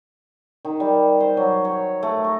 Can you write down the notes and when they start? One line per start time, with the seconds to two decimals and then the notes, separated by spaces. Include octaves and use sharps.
0.65 D#3
0.80 G3
1.20 C5
1.37 F#3
1.65 C#5
2.03 A3
2.24 A#5